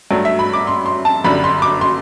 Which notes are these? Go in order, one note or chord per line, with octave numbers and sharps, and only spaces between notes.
G2 F#3 A3
E5
B5
D6
C6
C6
A5
G1 F#2 D3 G3 B5
C6
D6
C6